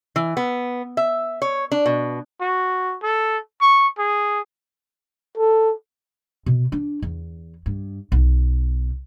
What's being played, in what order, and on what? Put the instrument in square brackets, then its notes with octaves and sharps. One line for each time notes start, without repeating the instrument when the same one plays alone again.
[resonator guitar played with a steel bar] E3
B3
E5
C#5
D4
B2
[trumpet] F#4
A4
C#6
G#4
[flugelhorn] A4
[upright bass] B2
D4
E2
G2
B1